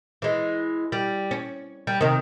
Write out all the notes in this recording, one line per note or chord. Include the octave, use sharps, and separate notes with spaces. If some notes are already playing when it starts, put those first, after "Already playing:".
E3 G#3
G3
C#4
G3
C3 D#3